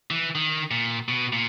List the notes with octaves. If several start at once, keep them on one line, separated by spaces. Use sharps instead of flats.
E3
D#3
A#2
B2
A#2